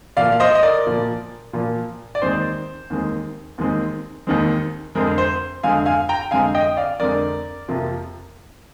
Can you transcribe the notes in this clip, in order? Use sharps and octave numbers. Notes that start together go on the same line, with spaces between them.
A#2 F3 A#3 D5 F5
F5
C5 D#5
D#5
A#4 D5
A#2 F3 A#3
A#2 F3 A#3
D5
D#2 D#3 G#3 C4 C5
D#2 D#3 G#3 C4
D#2 D#3 G#3 C4
D#2 D#3 G#3 C4
F2 D3 G#3 C4 A#4
C5
F2 D3 G#3 C4 F5 G#5
F5 G#5
G5 A#5
F2 D3 G#3 C4 F5 G#5
D#5 G5
D5 F5
F2 D3 G#3 C4 A#4 D5
F2 C3 F3 A#3